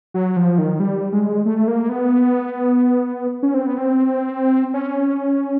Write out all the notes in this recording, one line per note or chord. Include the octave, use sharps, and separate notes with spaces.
F#3
F3
D#3
G3
G#3
A3
A#3
B3
C#4
C4
B3
C4
C#4